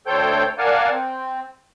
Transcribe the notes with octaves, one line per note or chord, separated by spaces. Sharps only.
D2 A4 C5 C#5 G5 G6
A#4 D5 F5 F#5 G#5 A5
C4